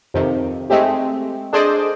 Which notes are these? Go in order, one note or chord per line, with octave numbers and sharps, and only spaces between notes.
F2 C3 D#3
G#3 A3 C4 G4
D4 G#4 A4 C5 D5 D#5